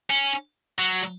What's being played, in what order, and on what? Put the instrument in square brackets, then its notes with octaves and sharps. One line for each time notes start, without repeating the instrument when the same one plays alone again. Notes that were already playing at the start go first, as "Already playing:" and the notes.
[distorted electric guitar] C#4
F#3